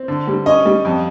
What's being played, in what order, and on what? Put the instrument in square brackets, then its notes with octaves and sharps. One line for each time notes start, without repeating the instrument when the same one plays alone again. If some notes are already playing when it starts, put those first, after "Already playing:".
Already playing: [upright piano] C4
D3
G3
[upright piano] C#4 [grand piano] D#5
[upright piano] G3
F2